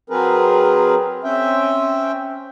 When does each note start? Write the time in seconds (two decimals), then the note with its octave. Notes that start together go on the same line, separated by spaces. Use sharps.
0.10 F#3 C4 G#4 A#4 B4
1.24 C4 C#4 E5 G5